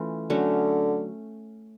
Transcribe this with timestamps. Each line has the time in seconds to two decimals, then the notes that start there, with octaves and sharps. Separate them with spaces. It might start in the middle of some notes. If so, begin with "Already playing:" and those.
Already playing: E3 A3 C#4 F4
0.30 D3 F#3 A3 C#4